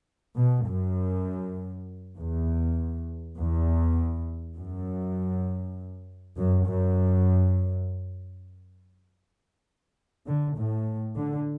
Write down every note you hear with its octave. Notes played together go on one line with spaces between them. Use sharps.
B2
F#2
E2
E2
F#2
F#2
F#2
D3
A2
D3